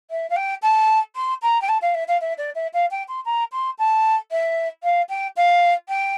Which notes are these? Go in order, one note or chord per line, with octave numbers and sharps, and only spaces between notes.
E5
F5
G5
A5
C6
A#5
G5
A5
F5
E5
F5
E5
D5
E5
F5
G5
C6
A#5
C6
A5
E5
F5
G5
F5
G5